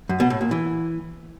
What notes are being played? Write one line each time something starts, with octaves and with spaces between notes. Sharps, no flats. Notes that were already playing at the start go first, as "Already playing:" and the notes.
F#2
B2
A2
A#2
E3